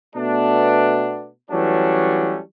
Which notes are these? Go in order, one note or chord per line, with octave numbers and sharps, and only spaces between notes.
B2 A3 B3 D4
E3 F#3 G3 A3 C#4 D4